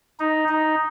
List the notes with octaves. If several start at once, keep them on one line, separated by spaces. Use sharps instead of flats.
D#4
D#4